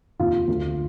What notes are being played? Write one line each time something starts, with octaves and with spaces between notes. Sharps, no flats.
F1 D#2 D#3 F4
D2 D3